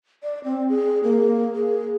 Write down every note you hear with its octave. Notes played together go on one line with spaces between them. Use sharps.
D5
C4
G#4
A#3
G#4